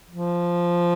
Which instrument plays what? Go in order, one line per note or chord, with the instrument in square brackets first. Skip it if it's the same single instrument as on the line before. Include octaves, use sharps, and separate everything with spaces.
[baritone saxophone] F3